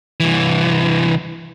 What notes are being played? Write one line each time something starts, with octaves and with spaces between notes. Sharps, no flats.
C2 E3